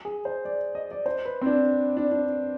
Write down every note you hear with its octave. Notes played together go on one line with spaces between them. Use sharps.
G#4
C5
D5
D#5
D5
C5
B4
C4
D4
D4
D4